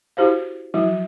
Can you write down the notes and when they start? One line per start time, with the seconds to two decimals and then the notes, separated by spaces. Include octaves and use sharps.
0.17 E4 F#4 G4 C5 F5
0.74 F3 F#3 E4 F#4